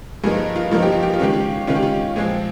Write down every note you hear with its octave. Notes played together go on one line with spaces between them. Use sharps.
G2 F3 A#3 D#4 G#4
F4
G2 F3 A#3 D#4 F4
G4
F4
G4
F4
D#3 G#3 C#4 G4
F4
D#3 G#3 C#4 F4
G4
F4
A#2 F3 G#3 C4 G#4